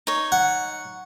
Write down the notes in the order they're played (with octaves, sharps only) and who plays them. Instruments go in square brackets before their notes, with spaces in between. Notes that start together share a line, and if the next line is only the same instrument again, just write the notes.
[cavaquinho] D#4 C#5
[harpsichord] F#5